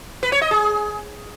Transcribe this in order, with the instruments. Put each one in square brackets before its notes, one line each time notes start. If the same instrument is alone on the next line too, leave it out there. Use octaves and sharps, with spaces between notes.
[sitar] B4
C#5
D#5
G#4